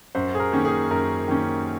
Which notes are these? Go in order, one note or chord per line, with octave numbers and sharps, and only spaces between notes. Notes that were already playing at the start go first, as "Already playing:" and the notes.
F#2 C5
G#4
A#4
D#3 A#3 C#4
G#4
F#2 A#4
D#3 A#3 C#4